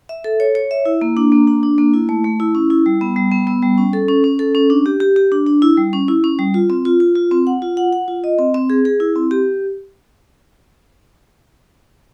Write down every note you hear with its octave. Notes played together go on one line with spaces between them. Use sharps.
E5
A4
C#5
C#5
E5
E4
A#3
D4
A#3
D4
D4
A#3
E4
A3
A3
E4
C#4
E4
G3
B3
G3
B3
B3
G3
C#4
A4
C#4
C#4
A4
C#4
D4
G4
G4
G4
D4
D4
E4
G3
C#4
E4
C#4
G3
F4
C4
F4
F4
F4
C4
F#5
F4
F#5
F#5
F4
D#5
C4
C4
G#4
G#4
E4
C4
G4